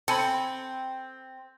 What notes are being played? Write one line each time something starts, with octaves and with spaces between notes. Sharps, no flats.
C4 A4 G#5 B5